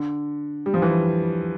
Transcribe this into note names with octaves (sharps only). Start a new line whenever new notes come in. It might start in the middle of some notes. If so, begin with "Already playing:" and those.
Already playing: D3
G3
F3
E3